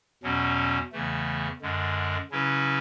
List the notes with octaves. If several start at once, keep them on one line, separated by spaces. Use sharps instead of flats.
E2 B2 F#3 C#4
E2 C#3 E3 A3
F#2 D3 G#3
C#3 F#3 C#4 E4 B4